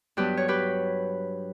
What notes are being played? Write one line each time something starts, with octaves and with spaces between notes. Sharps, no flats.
G2 F#3 B3 D4 G4 B4
C#5
G4 B4